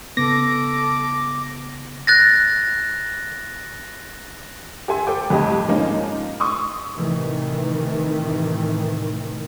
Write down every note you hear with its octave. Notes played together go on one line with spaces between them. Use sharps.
C#3 B3 A4 D6 A#6
F#6 A6 A#6
G4 A4 E5 G#5 C6
A4 C5 G5 D6
F2 A2 G3 G4 D#5
G#2 F3 A#3 C#4 D#4
C6 C#6 D#6 E6
A2 C3 D#3 E3 A3